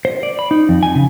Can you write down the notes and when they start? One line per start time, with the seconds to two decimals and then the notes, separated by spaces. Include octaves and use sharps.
0.05 C5
0.23 D5
0.39 B5
0.51 D#4
0.69 F2
0.83 G#5
0.95 C#3